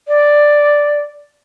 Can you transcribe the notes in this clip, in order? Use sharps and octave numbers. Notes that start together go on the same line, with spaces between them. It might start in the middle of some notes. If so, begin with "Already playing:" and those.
D5